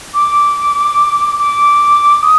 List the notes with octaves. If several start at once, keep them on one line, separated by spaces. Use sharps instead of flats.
D6
D6
D#6